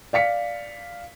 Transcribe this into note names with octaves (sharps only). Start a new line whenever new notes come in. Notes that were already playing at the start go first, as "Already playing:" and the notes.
D5 F5 B6 C#7